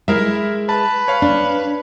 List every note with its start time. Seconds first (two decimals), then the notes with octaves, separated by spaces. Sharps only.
0.08 G#3 E4 A#4 E5
0.69 B4 A5
1.08 C#5 F5
1.22 D4